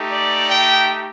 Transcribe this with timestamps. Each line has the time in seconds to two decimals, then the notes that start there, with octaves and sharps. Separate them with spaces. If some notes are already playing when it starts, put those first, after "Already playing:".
Already playing: A3 D#4 G4
0.10 D5
0.48 G5